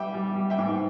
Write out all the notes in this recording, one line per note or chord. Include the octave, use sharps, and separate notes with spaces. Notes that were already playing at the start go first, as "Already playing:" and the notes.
Already playing: G3 E5 G5
G3
G3
E5 G5
G#2